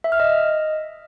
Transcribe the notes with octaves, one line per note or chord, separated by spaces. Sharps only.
E5
F6
D#5